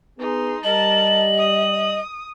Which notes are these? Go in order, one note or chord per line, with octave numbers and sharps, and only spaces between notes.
B3 D#4 G#4 C6
G3 A#4 D#5 A5 F#7
D#6